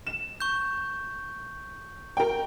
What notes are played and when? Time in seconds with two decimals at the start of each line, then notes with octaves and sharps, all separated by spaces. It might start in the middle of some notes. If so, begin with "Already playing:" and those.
0.07 E7
0.40 C#6 G6
2.17 A#4 G5